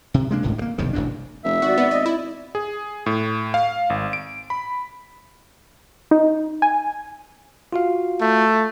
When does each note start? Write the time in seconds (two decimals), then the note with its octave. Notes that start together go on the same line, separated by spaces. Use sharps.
0.14 C3
0.31 G#3 A#3 D4
0.43 D1 G#1 C#2 A2
0.58 G2 A#3
0.78 F1 B1 G2 D#3
0.93 E1 A1 F#2 D4
1.44 F1 E5
1.62 G#1 F#4 D5
1.78 B3
1.91 D#5
2.06 E4
2.55 G#4
3.06 A2
3.54 F5
3.90 G#1
4.13 D7
4.50 B5
6.11 D#4
6.62 G#5
7.73 F4 F#4 F5
8.21 A3